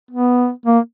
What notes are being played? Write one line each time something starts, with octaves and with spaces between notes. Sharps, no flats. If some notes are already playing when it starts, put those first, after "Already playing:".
B3
A#3